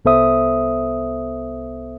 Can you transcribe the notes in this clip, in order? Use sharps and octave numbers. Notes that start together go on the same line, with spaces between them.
C2 B3 A4 C5 E5 D#6